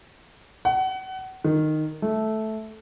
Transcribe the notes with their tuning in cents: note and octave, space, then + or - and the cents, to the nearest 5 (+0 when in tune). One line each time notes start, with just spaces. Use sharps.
F#5 +30
D#3 -10
A3 -10